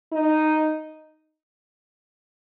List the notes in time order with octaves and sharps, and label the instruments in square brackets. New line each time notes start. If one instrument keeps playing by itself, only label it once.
[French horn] D#4